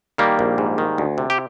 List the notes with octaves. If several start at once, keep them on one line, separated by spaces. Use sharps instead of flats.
D#3 G3 A#3
A#1
G#2
D#3
D2
C3
G4